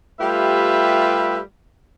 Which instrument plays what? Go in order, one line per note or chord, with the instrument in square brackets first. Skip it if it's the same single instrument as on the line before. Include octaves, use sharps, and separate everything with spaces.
[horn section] G3 A3 F4 G4 B4 E5